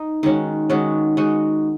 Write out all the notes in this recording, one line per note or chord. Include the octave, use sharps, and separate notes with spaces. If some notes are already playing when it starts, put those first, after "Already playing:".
Already playing: D#4
D#3 G#3 C#4 F#4
D#3 G#3 C#4 F#4
G#3 D#4 F#4